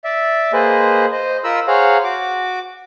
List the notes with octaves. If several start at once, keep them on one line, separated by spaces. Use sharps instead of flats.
D5 E5
A#3 G#4 B4 C5 D#5
C5 D#5
F4 A#4 D#5 B5 E6
G#4 C5 C#5 F5 F#5 A#5
F#4 D6